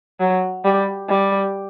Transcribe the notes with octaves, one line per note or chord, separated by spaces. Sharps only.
F#3
G3
G3